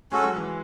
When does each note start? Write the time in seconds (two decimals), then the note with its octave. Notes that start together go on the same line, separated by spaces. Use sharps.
0.12 G#3 C#4 F#4 A4
0.24 F#3
0.36 E3